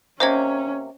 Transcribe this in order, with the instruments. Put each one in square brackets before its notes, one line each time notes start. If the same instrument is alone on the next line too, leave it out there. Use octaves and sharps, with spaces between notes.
[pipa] C3 A#3 [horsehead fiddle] C#4 [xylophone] C5 D#5 G#6